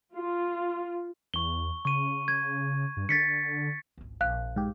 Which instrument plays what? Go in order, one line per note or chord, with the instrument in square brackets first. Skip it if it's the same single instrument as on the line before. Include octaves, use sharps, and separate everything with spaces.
[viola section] F4
[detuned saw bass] E2 [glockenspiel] C#6 G7
[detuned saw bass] C#3 [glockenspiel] C#6 D#7
[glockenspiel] G#6
[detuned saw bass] G2
[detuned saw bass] D3 [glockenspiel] A6 B6 C#7
[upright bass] G#1 C#2
[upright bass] A#1 C3 [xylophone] F5 F#6
[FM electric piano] G#2 G4